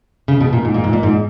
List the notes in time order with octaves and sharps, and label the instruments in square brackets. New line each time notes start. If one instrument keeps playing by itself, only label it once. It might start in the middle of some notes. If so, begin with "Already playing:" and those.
[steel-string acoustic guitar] C#3
B2
A#2
G#2
A#2
G#2
A#2
G#2